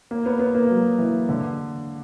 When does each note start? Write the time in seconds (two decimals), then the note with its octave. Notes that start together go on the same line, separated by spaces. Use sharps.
0.11 A#3
0.26 B3
0.39 B3
0.55 A#3
0.70 F#3
0.98 E3
1.29 D3